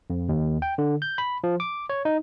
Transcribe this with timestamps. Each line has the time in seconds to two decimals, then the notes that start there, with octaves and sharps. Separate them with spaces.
0.10 F2
0.29 D#2
0.62 G5
0.78 D3
1.02 G6
1.18 B5
1.44 F3
1.60 D6
1.90 C#5
2.05 D#4